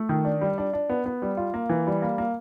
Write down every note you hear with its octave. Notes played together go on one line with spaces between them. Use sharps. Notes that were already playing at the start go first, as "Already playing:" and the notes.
Already playing: A3
D#3
D4
G3
D4
D4
B3
B3
G3
F4
A#3
E3
G3
A#3
A#3